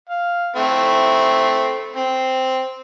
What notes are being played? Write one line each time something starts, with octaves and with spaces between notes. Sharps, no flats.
F5
A3 C4 E4
C4